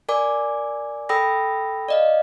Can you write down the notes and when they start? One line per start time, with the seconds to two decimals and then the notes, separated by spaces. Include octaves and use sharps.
0.09 A#4 D5 G#5 D6
1.09 A4 G5 B5 D#6 E6 A#6
1.89 D5 D#5 F5